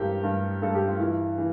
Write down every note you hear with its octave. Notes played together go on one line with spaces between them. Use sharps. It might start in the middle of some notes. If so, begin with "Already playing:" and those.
Already playing: G2 E3 F4 G4 A4 A#4 C5
G2
G2 A4
G4
F4
E3 E4
E3